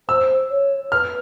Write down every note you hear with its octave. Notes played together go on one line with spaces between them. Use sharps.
C5 E6
C#5
B4 F6